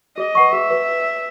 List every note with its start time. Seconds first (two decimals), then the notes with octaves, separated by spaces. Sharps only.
0.17 G#4 D#5
0.35 B4 F#5 C#6
0.52 G#4 E5
0.70 B4